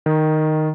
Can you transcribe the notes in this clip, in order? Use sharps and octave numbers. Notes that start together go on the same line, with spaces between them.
D#3